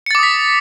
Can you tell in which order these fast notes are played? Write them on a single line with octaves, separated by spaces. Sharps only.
C#7 A6 D6 D#6 B6